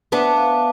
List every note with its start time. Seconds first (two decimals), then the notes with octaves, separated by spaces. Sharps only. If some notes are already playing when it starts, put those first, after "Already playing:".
0.12 B3 D4 E5
0.37 F5